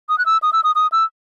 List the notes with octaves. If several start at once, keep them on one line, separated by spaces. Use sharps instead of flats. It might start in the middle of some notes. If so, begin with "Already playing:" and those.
D#6
F#6
E6
D#6
E6
D#6
D#6
E6